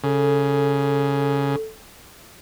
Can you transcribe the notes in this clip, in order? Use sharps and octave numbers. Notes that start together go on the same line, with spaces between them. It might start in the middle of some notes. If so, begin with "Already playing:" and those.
C#3 A4